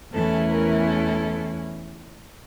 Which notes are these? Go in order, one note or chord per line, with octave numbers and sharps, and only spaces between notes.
E2 E3 A3 C#4 E4 A4
A#4
A4